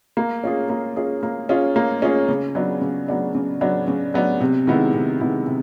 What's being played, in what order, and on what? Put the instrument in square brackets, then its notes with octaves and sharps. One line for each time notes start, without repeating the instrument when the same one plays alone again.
[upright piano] A#3
C#4 F4 G#4
A#3
C#4 F4 G#4
A#3
C#4 F4 G#4
A#3
C#4 F4 G#4
C#3
F#3 B3 D4
C#3
F#3 B3 D4
C#3
F#3 B3 D4
C#3
F#3 B3 D4
C3
D#3 G#3 B3 E4
C3
D#3 G#3 B3 E4
C3